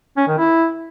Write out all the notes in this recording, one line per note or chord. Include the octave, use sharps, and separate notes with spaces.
C#4
D#3
E4